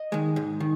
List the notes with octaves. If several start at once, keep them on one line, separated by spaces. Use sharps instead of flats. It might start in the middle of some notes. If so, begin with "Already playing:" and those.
Already playing: D#5
D#3 G#3
G#2
D#3